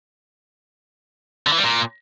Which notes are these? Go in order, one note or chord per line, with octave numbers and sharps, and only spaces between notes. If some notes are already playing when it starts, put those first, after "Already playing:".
D3
E3
G3
A#2